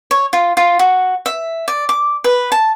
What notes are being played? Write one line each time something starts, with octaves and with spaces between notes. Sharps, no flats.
C#5
F4
F4
F#4
E5
D5
D6
B4
A5